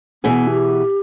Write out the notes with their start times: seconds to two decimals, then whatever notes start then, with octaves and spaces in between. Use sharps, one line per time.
0.24 B2 E3 B3 G#4
0.50 G4